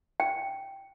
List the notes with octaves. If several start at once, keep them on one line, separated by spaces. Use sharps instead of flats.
G5